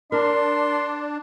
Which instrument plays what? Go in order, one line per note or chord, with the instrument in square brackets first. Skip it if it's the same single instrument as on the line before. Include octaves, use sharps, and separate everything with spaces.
[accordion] D4 [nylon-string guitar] A#4 [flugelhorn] D5 [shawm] C6